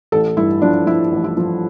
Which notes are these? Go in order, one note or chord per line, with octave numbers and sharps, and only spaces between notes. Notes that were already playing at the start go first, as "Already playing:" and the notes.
A1 A4
G2 E4
F3 D4
F3 E4
A1
E4
F3